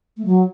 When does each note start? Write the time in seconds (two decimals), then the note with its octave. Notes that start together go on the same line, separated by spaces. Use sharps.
0.17 A3
0.25 F#3